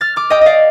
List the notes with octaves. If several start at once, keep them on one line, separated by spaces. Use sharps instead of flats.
F6 A6
D6 F6
D#5 G5
D5 D#5 F5